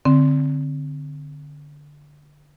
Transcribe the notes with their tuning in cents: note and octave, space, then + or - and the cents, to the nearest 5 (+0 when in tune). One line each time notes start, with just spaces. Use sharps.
D3 +0 C4 +0